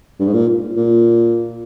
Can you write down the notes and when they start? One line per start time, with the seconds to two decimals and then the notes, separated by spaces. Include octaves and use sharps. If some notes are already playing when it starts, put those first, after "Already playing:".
0.19 G2
0.27 G#2
0.34 A#2
0.76 A#2